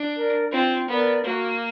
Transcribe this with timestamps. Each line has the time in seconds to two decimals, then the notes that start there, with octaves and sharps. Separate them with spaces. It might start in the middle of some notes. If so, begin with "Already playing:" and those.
Already playing: D4
0.16 A#4 D5
0.52 C4 F4
0.88 B3 A#4 D5
1.24 A#3 F#4